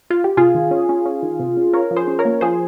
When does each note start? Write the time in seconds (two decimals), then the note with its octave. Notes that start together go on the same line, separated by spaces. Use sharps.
0.10 F4
0.24 G4
0.37 C3 F4 G#4
0.55 D#3
0.71 C#4
0.89 C#4
1.06 C#4
1.22 D#3
1.40 C3
1.57 C#4
1.73 C#4 A#4 C#5
1.91 F3
1.97 G#4 C5
2.08 C#4
2.19 A#4 C#5
2.25 A#3
2.41 F3 G#4 C5